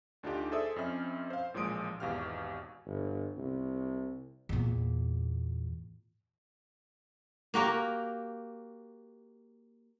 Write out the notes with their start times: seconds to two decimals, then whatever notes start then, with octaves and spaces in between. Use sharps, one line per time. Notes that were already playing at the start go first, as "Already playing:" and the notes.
0.23 D2 D4 D#4 F4 G4
0.51 G#4 A4 C5 D5 E5 D#6
0.76 F2 C4 C#4 E5 F6
1.30 C5 F5
1.54 A1 A#2 F3 G#3 D#6 D7
2.00 G#1 E2 B2 G4 F5 F6
2.86 G1
3.37 C2
4.49 E2 A#2
7.54 A#3 F#4 G4 A#4